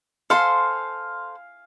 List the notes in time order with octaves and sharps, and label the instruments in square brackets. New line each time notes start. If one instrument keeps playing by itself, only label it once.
[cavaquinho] A4 C5 C6 [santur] F5 G#5